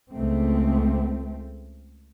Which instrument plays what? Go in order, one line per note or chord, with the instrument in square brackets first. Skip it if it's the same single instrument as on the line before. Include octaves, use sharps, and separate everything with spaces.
[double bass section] C#2 A3 C4